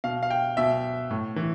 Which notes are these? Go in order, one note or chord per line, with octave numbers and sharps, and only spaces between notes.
B2 F5
F5
G5
B2 E5
A2
E3